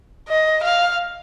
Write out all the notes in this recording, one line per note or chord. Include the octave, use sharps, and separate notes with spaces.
D#5
F5